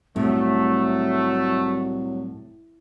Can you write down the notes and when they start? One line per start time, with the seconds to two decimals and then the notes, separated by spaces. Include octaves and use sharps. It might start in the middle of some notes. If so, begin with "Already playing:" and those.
0.16 C2 A2 F#3 A3